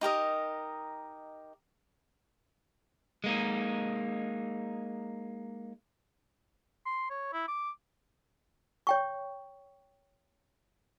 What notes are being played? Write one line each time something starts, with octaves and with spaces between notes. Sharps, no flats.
D#4 G4 A#4 D#5
G#3 A#3 D#4
C6
C#5
E4
D6
C#5 G5 C#6